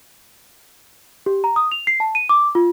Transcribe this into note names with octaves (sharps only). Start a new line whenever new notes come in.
G4
A#5
D#6
F7
C7
A5
D#7
D6
F4